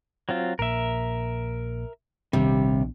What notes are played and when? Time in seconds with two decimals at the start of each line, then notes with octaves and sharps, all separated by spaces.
0.29 F#3 C4 F4
0.59 A#1 A#2 A#4 E5
2.33 A#1 D#2 C3 G3 D4